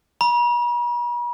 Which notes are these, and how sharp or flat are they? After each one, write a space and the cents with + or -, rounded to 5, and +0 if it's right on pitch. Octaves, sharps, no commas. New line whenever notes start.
B5 -45